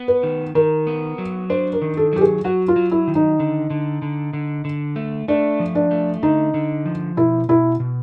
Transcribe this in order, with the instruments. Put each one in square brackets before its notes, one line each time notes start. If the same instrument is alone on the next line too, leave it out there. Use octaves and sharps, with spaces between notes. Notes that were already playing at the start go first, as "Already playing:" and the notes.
Already playing: [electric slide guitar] B3
[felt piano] B4
[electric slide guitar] D#3
[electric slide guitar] D#3 [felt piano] A#4
[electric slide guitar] B3
F#3
[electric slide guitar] D4 [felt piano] C5
[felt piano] A#4
[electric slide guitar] D#3
[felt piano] A4
[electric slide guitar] F#3 [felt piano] G4
[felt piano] G#4
[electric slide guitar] F#3 [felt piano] F#4
[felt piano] F4
[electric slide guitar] F#3
[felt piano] E4
[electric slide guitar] D#3
[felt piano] D#4
[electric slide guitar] D3
D3
D3
D3
D3
A3
[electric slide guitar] A3 [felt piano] D4
[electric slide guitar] F3
[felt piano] D4
[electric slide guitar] A3
[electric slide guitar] D3 [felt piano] D#4
[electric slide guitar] D3
F3
[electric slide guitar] B2 [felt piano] E4
[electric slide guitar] B2 [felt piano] E4
[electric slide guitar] B2